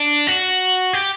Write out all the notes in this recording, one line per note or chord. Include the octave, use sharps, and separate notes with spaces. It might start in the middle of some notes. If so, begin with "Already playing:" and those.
Already playing: D4
F#4
G4